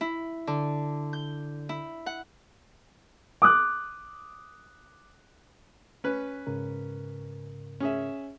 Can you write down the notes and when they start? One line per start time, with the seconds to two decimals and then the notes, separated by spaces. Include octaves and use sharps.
0.01 E4
0.47 D3
1.13 G6
1.69 E4
2.06 F#5
3.42 D6 D#6 F#6
6.04 C#4 B4
6.47 G#2 C#3 A#4
7.80 C#4 G#4 E5